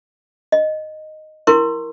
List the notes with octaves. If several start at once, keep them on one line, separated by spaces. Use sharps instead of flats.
D#5
E4 A#4 C6 C#6